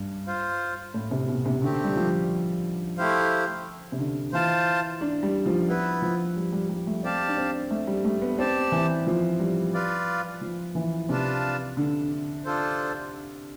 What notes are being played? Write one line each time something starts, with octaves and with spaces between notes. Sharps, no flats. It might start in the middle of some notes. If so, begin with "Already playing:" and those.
Already playing: G2
F4 C5 F5
A2
C3
B2
C3
D3 A3 C4 G4
G3
F3
A3 E4 G4 C5 F5
C3
D3
E3 F4 C5 F5 A5
D4
G3
F3
B3 E4 B4
F3
G3
G3
G3
A3
C4 G4 D5 F5 A5
D4
C4
A3
G3
A3
B3
C4 G4 D5 A5
E3
F3
G3
F4 B4 D5 F5
F3
E3
C3 D4 F4 B4 F5 A5
D3
D4 F4 A4 C5